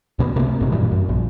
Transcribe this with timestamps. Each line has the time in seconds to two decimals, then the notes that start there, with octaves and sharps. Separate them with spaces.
0.19 C#2 B2 G#3 B3
0.36 C3 A3 A#3
0.60 G#1 G#2 C3
0.72 F#2 A#2 E3 G3
0.91 F#2
1.09 A#1